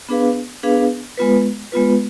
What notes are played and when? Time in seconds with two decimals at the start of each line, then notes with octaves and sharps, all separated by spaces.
0.09 B3 D4 G#4 B4 F5
0.63 B3 D4 G#4 B4 F5
1.17 G#3 B3 F4 B4
1.72 G#3 B3 F4 B4